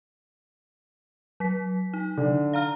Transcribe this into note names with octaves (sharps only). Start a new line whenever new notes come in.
F#3 B6
D#4
D3
F5 A#5 F6